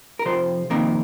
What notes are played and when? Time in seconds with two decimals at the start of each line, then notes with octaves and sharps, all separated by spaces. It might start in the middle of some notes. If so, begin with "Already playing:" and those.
0.19 A#4
0.25 F2 C3 F3 C5
0.70 F2 C3 D#3 A#3 A#4